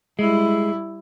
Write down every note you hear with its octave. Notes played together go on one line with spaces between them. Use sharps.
G3 G#3 E4